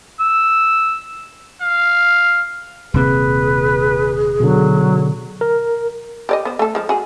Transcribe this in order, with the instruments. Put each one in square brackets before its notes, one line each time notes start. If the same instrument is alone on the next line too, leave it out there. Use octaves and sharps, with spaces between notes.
[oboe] E6
[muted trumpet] F5
[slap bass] D#1 C3 A#3 [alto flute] G#4 [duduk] B4
[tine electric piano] B2 D3 [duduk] F#3
[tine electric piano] A#4
[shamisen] G4 D5 D#5
B3 C5
A3 A4
F3 G#3
F#4 G#4